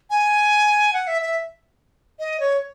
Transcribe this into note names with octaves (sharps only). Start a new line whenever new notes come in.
G#5
F#5
E5
E5
D#5
C#5